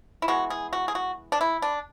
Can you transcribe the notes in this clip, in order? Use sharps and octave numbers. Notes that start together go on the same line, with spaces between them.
E4
E3 G#3 B3 F#4
G#4
F#4
G#4
F#4
D4
E4
D4